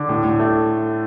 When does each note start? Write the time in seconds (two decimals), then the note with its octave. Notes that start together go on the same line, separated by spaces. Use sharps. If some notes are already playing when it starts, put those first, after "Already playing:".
Already playing: D3 D6
0.09 A2
0.24 A2
0.40 A3